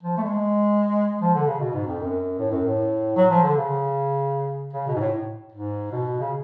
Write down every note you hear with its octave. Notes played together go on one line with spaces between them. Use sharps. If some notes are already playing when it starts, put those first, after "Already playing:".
F3
A3
G#3
F3
D3
C#3
B2
G#2
F2
F#2
A2
F#2
A2
F#3
F3
D3
C#3
C#3
B2
G#2
A2
G#2
B2
C#3